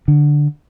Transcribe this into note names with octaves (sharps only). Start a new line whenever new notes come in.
D3